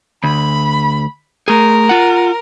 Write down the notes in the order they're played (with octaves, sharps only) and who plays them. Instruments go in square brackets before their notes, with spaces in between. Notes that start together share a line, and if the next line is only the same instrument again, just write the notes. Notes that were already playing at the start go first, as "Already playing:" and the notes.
[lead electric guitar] D2 [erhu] B5
[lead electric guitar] A3 G#4 [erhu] A#4
[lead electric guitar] F4 F#5